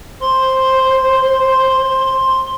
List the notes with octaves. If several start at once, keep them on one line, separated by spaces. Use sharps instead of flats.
C5 C6